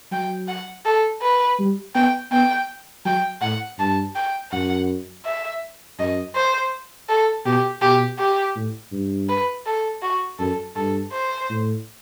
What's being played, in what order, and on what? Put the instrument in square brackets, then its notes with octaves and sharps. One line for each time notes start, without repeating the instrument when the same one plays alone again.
[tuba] F#3 [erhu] G5
[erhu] F#5
A4
B4
[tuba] G3
[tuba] B3 [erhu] G5
[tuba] B3 [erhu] G5
[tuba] F#3 [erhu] G5
[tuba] A2 [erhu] F#5
[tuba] G2 [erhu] A5
[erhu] G5
[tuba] F#2 [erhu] F#5
[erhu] E5
[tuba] F#2 [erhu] D#5
[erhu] C5
A4
[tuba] B2 [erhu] G4
[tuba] B2 [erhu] G4
[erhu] G4
[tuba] A2
G2
[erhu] B4
A4
F#4
[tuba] F#2 [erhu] A4
[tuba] G2 [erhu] A4
[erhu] C5
[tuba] A2